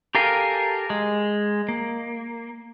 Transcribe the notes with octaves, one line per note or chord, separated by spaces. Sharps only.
G4 A4 A#4 F5 G#5
G#3
A#3